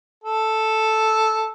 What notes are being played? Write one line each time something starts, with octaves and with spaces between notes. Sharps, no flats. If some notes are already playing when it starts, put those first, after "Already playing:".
A4